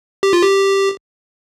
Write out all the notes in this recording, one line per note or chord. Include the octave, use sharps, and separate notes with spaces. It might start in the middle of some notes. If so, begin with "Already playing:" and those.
G4
F4
G4